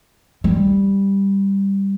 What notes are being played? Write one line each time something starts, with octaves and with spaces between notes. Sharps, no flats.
G3